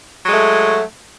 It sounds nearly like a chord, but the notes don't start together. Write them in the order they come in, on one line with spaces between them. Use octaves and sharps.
F#3 G#3 A3